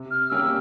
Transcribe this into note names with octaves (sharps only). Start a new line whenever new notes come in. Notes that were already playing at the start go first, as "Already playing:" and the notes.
Already playing: C3
F6
G3 A#3 C#4 G4 E6